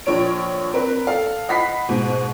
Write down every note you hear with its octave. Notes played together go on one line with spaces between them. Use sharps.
A#1 A#2 C#5 D7
C4 A#4 B4
A4 F5
D#5 F#5 B5 B6 C7
G#2 B2